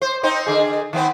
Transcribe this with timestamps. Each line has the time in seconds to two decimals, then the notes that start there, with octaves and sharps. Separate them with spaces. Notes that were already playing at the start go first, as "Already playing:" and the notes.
0.02 C5
0.23 C4 D#4 C5
0.46 D3 G#4
0.93 D#3 B3 C4